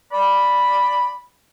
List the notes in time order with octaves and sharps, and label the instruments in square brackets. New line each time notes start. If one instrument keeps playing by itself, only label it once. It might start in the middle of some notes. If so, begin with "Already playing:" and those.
[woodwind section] D5 B5